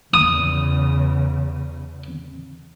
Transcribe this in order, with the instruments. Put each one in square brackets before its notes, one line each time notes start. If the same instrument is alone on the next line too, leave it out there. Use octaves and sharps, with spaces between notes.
[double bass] E2 C#3 [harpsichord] D#6